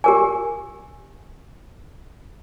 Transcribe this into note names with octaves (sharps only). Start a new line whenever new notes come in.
G4 A#4 G#5